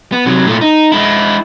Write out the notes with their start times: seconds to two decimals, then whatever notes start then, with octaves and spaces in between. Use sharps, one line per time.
0.12 B3
0.26 C3 F#3
0.46 A#2 A3
0.61 D#4
0.92 G#3 E4